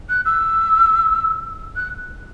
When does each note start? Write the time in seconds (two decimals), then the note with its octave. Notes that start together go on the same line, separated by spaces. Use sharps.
0.09 F#6
0.25 E6
1.76 F#6